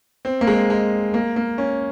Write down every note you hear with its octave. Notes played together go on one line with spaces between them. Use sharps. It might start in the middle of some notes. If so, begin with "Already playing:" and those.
C4
A#3
G#3
G#3
A#3
A#3
C#4